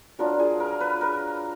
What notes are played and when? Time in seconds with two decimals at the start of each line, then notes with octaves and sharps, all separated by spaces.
0.19 F#3 D4 F4 A#4
0.39 G#4
0.60 A#4
0.80 B4
1.01 A#4